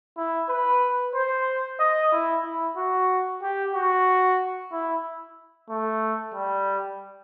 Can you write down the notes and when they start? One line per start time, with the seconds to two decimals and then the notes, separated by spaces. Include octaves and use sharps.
0.17 E4
0.49 B4
1.15 C5
1.79 D#5
2.13 E4
2.45 E4
2.77 F#4
3.42 G4
3.75 F#4
4.72 E4
5.70 A3
6.34 G3